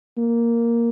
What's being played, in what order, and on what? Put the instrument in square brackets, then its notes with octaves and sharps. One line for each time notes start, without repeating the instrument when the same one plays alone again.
[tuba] A#3